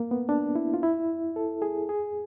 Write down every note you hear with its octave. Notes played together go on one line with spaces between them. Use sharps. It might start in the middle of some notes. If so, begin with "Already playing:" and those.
Already playing: A#3
B3
D4
E4
F4
E4
A4
G#4
G#4